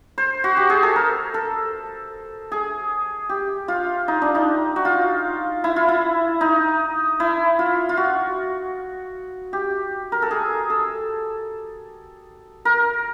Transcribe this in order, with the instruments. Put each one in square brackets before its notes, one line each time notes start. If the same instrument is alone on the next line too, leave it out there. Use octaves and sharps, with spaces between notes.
[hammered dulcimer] C5
F#4
G4
G#4
A4
A#4
A4
G#4
G4
F4
D#4
D4
D#4
F#4
F4
E4
F4
E4
D#4
E4
F4
F4
F#4
G4
A#4
A4
G#4
A4
A#4